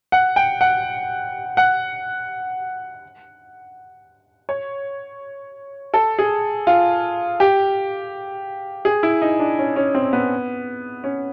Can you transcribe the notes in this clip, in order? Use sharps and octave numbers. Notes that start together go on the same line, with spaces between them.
F#5
G5
F#5
F#5
C#5
A4
G#4
F4
G4
G#4
E4
D#4
D4
C#4
C#4
C4
B3
C#4